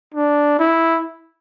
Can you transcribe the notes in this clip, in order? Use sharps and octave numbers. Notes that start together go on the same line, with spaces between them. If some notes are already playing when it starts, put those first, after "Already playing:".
D4
E4